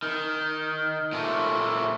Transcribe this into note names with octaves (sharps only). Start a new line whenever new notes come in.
D#3
A#2 A3